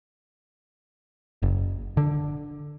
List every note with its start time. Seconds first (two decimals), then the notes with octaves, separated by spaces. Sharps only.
1.42 F#1
1.97 D3